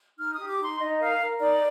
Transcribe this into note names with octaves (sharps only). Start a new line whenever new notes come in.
D#4 F6
G4 D#6
D6
D#4
C6
D#4 D#5
A#4 F5
A#4
D#4 D5